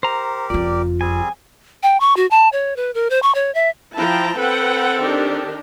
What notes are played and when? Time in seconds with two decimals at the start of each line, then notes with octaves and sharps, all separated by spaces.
0.03 G4 A#4 C5 A#5
0.50 F#1 F2 F4 D5
1.01 G3 C4 G#4 G#5
1.83 G5
2.00 C#6
2.17 F#4
2.31 A5
2.53 C#5
2.76 B4
2.95 A#4
3.10 C5
3.23 C#6
3.35 C#5
3.55 E5
3.95 F3 E4 G5 A5 A#5
4.38 C4 A4 B4 F#5 G5
5.00 D#3 D4 G4